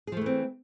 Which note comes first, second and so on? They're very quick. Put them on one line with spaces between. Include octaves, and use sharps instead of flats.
G#4 F3 A3 E3 C4